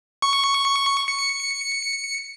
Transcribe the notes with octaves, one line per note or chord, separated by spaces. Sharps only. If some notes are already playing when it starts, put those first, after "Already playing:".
C#6
C#7